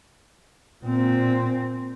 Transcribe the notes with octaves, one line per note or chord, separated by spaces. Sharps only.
A#2 C4